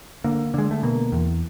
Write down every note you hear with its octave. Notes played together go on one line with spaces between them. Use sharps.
D3 A#3
D3 G#3
A3
B2 A#3
E2